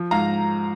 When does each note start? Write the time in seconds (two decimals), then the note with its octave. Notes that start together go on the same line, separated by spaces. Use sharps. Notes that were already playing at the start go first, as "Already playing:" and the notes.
Already playing: F3
0.11 G#2 F5 A#5